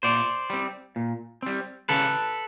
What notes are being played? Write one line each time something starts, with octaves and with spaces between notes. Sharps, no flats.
A#2 C5 D5
G3 C4
A#2
G3 C4
C#3 A4 B4